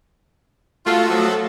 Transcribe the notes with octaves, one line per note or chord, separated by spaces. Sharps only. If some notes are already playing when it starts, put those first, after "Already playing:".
A3 F4 F#4 A4
F3 F#3